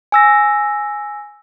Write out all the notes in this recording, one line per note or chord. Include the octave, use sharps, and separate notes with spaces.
G#5 E6 A#6